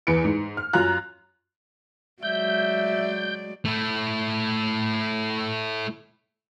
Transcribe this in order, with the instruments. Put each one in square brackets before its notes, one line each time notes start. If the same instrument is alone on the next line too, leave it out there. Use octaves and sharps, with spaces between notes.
[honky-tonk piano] E2 B4 C#7 D7
G#2
F6
F#2 F4 A#5 F#6
[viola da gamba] F#3 G#3 D5 [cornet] E5 [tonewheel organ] G6
[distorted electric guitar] A3 E4